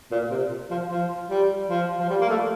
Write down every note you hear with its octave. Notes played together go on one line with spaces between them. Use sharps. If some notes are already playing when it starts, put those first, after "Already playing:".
A#2
C3
F3
F3
G3
F3
F3
G3
A#3
A3